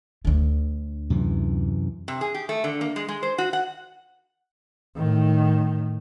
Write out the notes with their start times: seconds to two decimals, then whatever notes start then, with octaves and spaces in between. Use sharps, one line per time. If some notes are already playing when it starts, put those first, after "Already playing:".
0.25 D2 D3
1.10 F#2 C3 E3
2.08 C3
2.21 G#4
2.34 G4
2.49 A3
2.64 D3
2.81 A#3
2.96 G#3
3.08 G#3
3.23 C5
3.38 F#4
3.53 F#5
4.96 A2 D#3